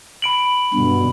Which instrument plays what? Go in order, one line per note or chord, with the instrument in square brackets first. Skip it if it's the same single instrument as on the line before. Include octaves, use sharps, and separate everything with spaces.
[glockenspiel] B5 D7 F#7
[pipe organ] G2 B2 D3